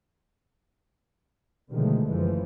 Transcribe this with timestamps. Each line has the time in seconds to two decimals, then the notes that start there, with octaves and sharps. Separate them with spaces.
1.71 B2 D3 D#3 F3 G#3 A3
2.10 F#1 E3 F3